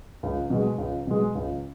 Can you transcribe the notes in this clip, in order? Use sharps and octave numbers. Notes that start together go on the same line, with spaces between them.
C#2
B2 G#3
C#2
B2 G#3
C#2